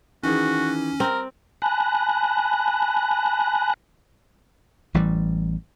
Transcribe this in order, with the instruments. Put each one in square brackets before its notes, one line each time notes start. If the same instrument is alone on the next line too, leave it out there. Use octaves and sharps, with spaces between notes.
[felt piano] D#3 E3 G#4 [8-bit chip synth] C#4 [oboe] F#4
[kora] C4 [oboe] A#4
[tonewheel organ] G#5 A5 B5 F#6 A#6
[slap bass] A1 E3 G3